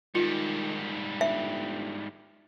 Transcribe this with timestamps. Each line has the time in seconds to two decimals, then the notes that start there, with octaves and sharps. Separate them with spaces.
0.15 G#2 D#3 G3 F4
1.21 G1 E5